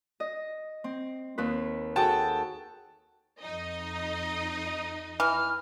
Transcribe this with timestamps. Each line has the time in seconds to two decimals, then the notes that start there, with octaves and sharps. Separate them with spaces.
0.20 D#5
0.84 C4
1.38 D#2 C4 B4
1.96 F#4 G#4 A4 G5 A5
3.40 F2 D#4 D#5
5.20 E3 F6